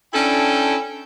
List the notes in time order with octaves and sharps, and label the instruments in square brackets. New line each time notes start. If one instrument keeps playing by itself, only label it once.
[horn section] C#4 D4 E4 A4 G5